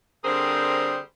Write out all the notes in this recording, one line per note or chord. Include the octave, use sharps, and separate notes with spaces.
D3 G3 C4 G#4 A#4 C5